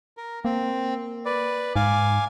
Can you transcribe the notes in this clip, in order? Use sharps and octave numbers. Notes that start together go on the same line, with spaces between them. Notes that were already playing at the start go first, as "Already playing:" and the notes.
A#4
A#3 C4
B4 D5
G#2 F5 G#5 D6